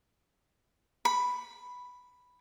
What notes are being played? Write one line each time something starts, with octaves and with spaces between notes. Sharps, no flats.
B5